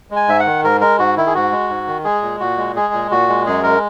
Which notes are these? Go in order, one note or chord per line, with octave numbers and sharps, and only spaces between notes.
G#3
G#5
G#2 E5
F#5
D#3
G#2 A#4
G#3 A#4
G#2 F#4
D#3 E4
G#4
G#2 F#4
G#3
G#2
D#3
G#3 G#4
A#2
A#2 F#4
G#3
G#3 G#4
A#2
A#2 F#4
G#3
F#2 G#4
G#3 A#4